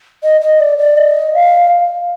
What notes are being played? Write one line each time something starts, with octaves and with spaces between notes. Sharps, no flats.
D#5
D#5
D5
D5
D#5
F5